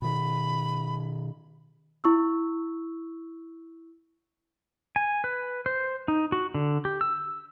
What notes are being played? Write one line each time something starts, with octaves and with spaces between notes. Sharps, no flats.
B2 D#3 B5
E4 C#6 E6
G#5
B4
C5
D#4
F#4
D3
G4
E6